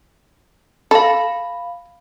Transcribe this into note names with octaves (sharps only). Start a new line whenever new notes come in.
A4 F5 B5